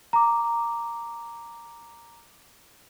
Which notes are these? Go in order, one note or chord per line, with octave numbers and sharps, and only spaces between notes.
A#5 D6